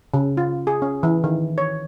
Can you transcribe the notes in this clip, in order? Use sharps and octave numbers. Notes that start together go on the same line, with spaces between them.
C#3
F4
G#4
C#4
E3
D#3
C#5